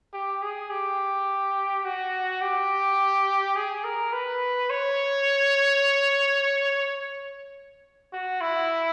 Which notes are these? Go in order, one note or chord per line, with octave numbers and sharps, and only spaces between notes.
G4
G#4
G4
F#4
G4
G#4
A#4
B4
C#5
F#4
E4